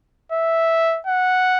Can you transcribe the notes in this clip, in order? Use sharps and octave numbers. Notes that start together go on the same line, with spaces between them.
E5
F#5